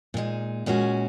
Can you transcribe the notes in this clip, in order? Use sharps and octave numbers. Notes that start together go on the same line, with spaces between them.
A#2 G#3 D#4
A#2 G#3 C#4 F#4